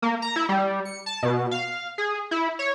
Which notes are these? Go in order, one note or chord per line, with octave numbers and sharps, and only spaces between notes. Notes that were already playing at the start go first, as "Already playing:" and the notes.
A#3
A#5
E4
G3
C#7
A5
B2
F5
G#4
E4
C#5